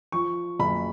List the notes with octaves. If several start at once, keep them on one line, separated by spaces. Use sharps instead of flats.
F3 C#6
F#1 B5